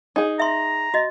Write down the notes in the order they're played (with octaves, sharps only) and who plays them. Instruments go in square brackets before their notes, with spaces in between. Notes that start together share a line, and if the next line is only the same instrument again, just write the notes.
[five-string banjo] D#4 G#4
[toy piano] E5 C6 [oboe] A#5
[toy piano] F#4 D#5